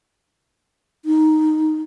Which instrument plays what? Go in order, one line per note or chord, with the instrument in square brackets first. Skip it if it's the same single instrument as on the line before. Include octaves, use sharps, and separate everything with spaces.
[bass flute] D#4